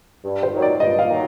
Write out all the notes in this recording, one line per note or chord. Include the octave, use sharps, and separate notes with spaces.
G2
C5
D#3 F#3
D5
G2 D#5
F5
D#3 F#3